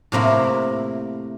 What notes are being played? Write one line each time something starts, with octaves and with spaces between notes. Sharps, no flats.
A2 C3 A#3 E4